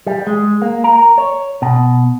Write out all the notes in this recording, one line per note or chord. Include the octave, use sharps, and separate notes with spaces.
G3
G#3
A#3
A#4
C#5
B2